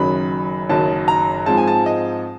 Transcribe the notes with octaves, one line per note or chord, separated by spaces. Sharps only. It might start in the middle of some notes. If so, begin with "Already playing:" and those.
Already playing: F#1 F#2 D#3 F#3 B5
F#1 F#2 D#3 F#3 A5
A#5
G#2 F3 G#3 C4 A5
G#5
A5
D#5